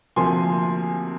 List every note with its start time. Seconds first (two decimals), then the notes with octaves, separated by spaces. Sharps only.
0.16 D2 C3 F3 A#3 G#5 C6